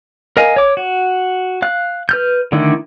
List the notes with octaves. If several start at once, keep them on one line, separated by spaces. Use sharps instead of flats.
A#4 D#5 F5 G#5
C#5 D6
F#4
F5 F#6
B4 F6 G6
D3 D#3 A3 D4 E4